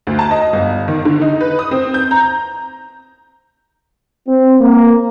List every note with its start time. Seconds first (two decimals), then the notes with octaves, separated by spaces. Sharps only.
0.07 D2
0.19 A5
0.31 D#5
0.53 G1
0.88 D#3
1.05 D3
1.22 D#4
1.41 B4
1.59 D#6
1.71 C4
1.94 G6
2.11 A#5
4.27 C4
4.60 A#3